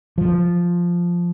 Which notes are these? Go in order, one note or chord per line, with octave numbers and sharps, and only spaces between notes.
F3